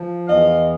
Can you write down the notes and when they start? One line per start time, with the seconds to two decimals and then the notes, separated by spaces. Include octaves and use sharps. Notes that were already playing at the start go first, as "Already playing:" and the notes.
Already playing: F3
0.27 E2 D#5 F5